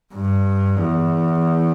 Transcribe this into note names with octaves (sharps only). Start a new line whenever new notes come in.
G2
E2